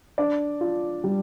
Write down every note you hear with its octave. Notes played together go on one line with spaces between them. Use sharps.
D4 D5
F4
G3